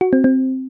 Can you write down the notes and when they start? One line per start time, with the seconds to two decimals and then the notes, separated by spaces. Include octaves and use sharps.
0.01 F#4
0.13 C4
0.24 C4